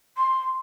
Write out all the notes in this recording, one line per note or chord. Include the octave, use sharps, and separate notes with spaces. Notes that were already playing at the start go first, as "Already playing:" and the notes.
C6